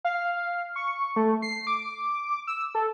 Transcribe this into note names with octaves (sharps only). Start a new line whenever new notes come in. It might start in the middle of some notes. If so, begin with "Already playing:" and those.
F5
C#6
A3
C7
D6
E6
A4